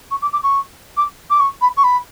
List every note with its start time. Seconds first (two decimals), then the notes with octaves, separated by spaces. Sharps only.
0.11 C#6
0.22 D6
0.33 D6
0.43 C#6
0.97 D6
1.30 D6
1.40 C#6
1.61 B5
1.77 C#6
1.84 B5